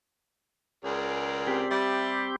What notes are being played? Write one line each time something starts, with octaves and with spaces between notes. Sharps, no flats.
C#2 G#4 A#4 D5
C4 G4
G3 E5